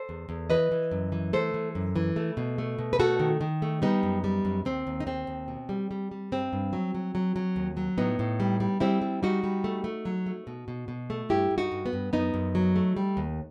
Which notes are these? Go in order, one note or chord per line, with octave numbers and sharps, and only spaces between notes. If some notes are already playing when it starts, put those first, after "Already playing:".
Already playing: A4 C5
E2
E2
E3 B4 D#5
E3
F#2
E3
A3 A4 C5
E3
F#2
E3
A3
B2
A3
B2
B4
A3 F#4 A4
D#3
D#3
A3
G3 B3 D#4
F#2
G3
F#2
D#2 C4
D#2
D#4
D#2 C4
D#2
B2
G3
G3
G3
G2 C4
G2
F#3
F#3
F#3
F#3
D#2
F#3
A2 B3 D#4
A2
G3
G3
G3 C4 E4
G3
G3 D#4 F#4
G3
A3
A3
F#3
A3
B2
B2
B2
A3
G2 E4 G4
G2
D#4 F#4
G2
B3
G2
F#2 B3 D#4
F#2
F#3
A3
G3
D#2